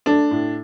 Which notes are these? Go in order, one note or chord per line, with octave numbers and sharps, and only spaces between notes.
A3 D4
A2